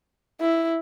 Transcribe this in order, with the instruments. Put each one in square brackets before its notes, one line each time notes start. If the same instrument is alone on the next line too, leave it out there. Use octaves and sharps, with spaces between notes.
[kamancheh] E4